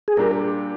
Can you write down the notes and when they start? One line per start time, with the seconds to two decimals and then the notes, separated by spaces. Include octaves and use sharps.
0.08 G#4
0.17 A#2 G3 D4 G4 A#4